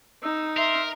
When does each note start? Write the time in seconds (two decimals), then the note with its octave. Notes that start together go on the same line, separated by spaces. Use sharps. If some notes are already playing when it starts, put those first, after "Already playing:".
0.23 D#4 E6
0.57 A#4 E5 C6